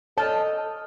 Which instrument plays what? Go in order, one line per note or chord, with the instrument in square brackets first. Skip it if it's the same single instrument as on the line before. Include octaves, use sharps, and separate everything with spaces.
[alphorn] A4 [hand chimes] C#5 F6 [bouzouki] D#5 [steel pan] A5